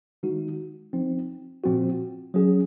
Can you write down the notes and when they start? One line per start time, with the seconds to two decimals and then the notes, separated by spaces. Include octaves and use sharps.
0.23 D#3 G#3 D#4 F#4
0.93 F3 C4 D#4
1.64 A#2 F3 C4 F#4
2.34 F#3 C#4 G#4